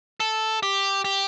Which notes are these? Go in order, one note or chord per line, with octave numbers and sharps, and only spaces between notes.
A4
G4
G4